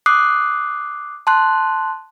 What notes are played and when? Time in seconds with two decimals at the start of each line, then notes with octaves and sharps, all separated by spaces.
0.06 D6 D#6 F#6 C7
1.27 A5 C6 F#6